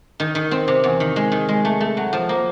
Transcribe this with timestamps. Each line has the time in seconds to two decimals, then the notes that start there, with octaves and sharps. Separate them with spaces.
0.20 D#3
0.35 D#3
0.51 C4
0.68 C3
0.84 E2
1.00 D#3
1.16 G#3
1.32 D#3
1.49 G#3
1.65 A3
1.80 A3
1.97 F#3
2.13 F3
2.29 A#3